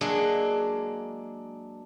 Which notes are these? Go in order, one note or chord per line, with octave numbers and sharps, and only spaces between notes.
F#3 G#3 A#3 D4